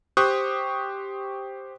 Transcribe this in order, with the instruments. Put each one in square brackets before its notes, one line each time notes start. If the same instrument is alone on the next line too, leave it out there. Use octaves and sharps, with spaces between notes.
[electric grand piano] G4 C5 C#6 D#6 F#6